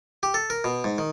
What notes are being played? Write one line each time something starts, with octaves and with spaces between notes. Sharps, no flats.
G4
A4
A#4
B2
G#2
D#3